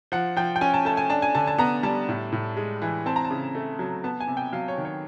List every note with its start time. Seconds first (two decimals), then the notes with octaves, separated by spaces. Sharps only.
0.12 F3 F#5
0.36 F3 G5
0.56 G5
0.61 C#4 G#5
0.74 A5
0.85 A3 A5
0.97 G#5
1.10 D4 A5
1.22 G#5
1.35 D3 A5
1.47 A5
1.58 B3 A#5
1.83 G3 A5
2.09 A2
2.32 A2
2.57 G#3
2.82 E3
3.06 C4 A5
3.16 A#5
3.24 A5
3.31 C#3
3.55 A3
3.79 F#3
4.04 B3 A5
4.20 G#5
4.28 C3
4.37 G5
4.53 F#3 F5
4.68 C#5
4.78 D#3
4.85 C#5